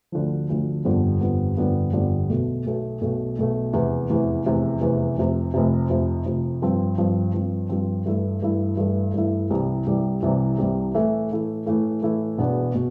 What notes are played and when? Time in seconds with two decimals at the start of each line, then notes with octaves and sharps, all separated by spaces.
0.12 D2 D3 F3
0.49 D2 D3 F3
0.85 G1 F2 D3 G3 B3
1.21 G1 F2 D3 G3 B3
1.57 G1 F2 D3 G3 B3
1.93 G1 F2 D3 G3 B3
2.29 B1 B2 A3
2.66 B1 B2 A3
3.01 B1 B2 A3
3.38 B1 B2 A3
3.73 F1 E2 C3 E3
4.09 F1 E2 C3 E3
4.45 F1 E2 C3 E3
4.81 F1 E2 C3 E3
5.17 F1 F2 C3
5.54 F1 F2 C3
5.89 F1 F2 C3
6.25 F1 F2 C3
6.62 G2 F3 C4
6.98 G2 F3 C4
7.34 G2 F3 C4
7.69 G2 F3 C4
8.06 G2 E3 A3 E4
8.42 G2 E3 A3 E4
8.77 G2 E3 A3 E4
9.14 G2 E3 A3 E4
9.50 C2 C3 E3 G3
9.86 C2 C3 E3 G3
10.22 C2 C3 E3 G3
10.58 C2 C3 E3 G3
10.94 A2 E3 A3 E4
11.30 A2 E3 A3 E4
11.66 A2 E3 A3 E4
12.02 A2 E3 A3 E4
12.38 E1 E2 B2 B3 D4
12.75 B2